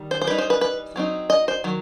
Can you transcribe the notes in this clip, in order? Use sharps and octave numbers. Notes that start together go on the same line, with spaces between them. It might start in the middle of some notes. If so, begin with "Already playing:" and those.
Already playing: D#3 G3
C5
C5
E3 G3 D#4 B4
C5
B4
B4
F#3 C4 D#4
D#5
C5
D#3 F#3